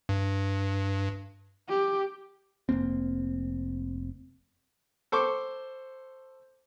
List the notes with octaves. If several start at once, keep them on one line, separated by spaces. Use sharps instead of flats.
G2
G4
F1 A#2 A#3 C4
A4 C5 C#6 D6